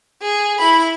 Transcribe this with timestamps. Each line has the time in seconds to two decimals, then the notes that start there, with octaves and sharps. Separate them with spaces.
0.22 G#4
0.59 E4 B5